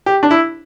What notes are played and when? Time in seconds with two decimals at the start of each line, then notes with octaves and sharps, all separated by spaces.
0.06 G4
0.23 D4
0.31 E4